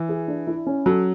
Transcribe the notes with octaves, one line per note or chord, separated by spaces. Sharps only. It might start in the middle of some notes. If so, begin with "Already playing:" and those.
Already playing: E3
G#4
D4
E4
C#4
F#3 A4